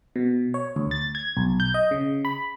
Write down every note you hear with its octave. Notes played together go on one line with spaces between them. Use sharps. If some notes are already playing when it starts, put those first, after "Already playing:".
B2
C#5
D2
A6
G#6
B1
G6
D#5
C#3
B5